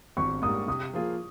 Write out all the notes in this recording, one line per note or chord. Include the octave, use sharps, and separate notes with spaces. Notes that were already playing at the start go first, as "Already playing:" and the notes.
G#1 C#6
G#2 G3 A#3 D#6
C3 D#6
F3 A#3 F4 G#4